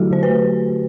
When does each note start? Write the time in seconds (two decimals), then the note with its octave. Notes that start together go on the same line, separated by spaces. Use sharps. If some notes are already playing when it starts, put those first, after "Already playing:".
Already playing: D3 F#3 A3 E4 F#4 G4 A4
0.11 D3 C5
0.23 B4
0.29 A3